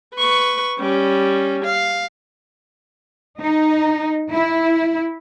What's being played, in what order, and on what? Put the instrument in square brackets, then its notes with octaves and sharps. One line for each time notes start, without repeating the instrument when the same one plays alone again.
[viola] B4 C#6
G3 C#4
F5
[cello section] D#4
E4